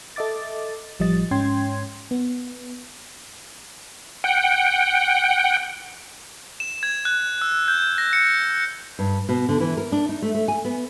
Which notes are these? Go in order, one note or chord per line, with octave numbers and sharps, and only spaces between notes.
A4 D#5 E5 D6 A6
A1 F3 G3 D#5 A6
G#2 C#4 G5 C6 G#6
B3
F#5 G5
E7
G#6
F#6
E6
G6
A#6
C#7
G2
B2
D3
E3
A#4
D4
D#4
A3
A3
G#5
B3